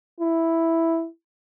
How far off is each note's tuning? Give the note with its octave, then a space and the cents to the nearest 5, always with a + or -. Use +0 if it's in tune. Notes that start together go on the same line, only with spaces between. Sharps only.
E4 +0